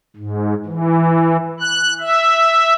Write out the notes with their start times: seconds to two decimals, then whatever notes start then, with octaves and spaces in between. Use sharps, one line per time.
0.16 G#2
0.66 E3
1.60 F#6
2.00 E5